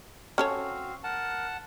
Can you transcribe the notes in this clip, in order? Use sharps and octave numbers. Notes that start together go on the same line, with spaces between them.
C4 C#4 F#4 A4 C#5 F5
A#4 F#5 A5